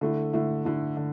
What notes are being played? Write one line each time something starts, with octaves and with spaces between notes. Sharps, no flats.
D3 A3 E4
D3 A3 E4
D3 A3 E4
D3